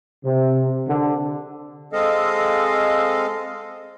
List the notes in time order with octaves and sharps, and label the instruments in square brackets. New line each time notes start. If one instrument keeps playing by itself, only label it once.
[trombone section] C3
D3
[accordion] G#3 C4 A4 D#5 F5